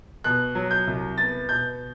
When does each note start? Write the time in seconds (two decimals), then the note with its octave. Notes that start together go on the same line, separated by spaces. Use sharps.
0.24 B2 F#6
0.55 F#3
0.71 G6
0.87 C2
1.18 B3 A6
1.49 B2 G6